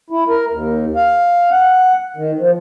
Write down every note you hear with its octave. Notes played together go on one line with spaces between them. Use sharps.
E4
A#4
D#2
F5
F#5
D#3
F3